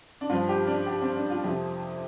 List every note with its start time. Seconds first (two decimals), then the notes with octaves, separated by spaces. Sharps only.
0.21 D4
0.29 G2 F3 F4
0.49 G4
0.67 D4
0.86 G4
1.02 C4
1.16 D4
1.30 F4
1.44 F2 C3 F3 G4